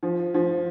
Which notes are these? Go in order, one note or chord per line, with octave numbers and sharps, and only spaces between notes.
F3
F3